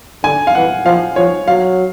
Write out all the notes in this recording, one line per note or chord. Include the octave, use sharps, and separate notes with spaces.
D3 G#5
F5
E3 F#5
F3 F5
F3 C#5
F#3 F5